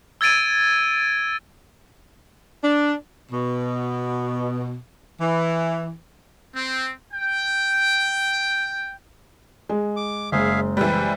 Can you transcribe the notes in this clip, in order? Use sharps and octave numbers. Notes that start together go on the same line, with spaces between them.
E6 G#6 A6 D7 D#7
D4
B2
E3
C4
G5
G#3
D6
F#1 G#3 G#4 C5 E5 F5
E3 G3 B4 G5